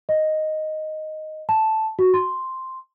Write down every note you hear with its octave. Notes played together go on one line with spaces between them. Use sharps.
D#5
A5
F#4
C6